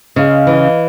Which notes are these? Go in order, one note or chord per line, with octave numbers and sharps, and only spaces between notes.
C#3 D#5 F5
E3